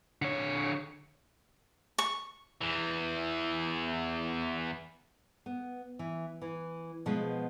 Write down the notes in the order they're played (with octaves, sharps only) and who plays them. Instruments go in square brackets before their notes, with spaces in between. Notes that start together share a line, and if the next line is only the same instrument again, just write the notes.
[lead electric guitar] D3 C#5
[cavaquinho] C#6
[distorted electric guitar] E2 E3
[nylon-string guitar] B3
E3
E3
B2 F3 G#3 B3